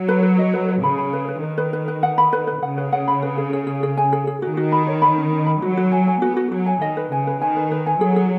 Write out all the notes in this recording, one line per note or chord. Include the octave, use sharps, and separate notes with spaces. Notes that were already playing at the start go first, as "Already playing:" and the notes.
Already playing: F#3
B4
B4
D#5
B4
B4
C#3 B5
B5
B4
B4
D#3 B4
B4
B4
B4
F#5
B5
B4
B4
C#3 F#5
B4
F#5
B5
B4
G#4
G#4
G#4
G#4
G#5
G#4
G#4
D#3 F#4
F#4
B5
C#5
B5
C#4
C#4
B5
F#3 F#4
F#4
G#5
G#5
B3 F#4
F#4
F#3 F#4
G#5
D#3 D#5
B4
C#3 G#5
B4
D#3 G#5
B4
B4
G#5
F#3 G#4
G#4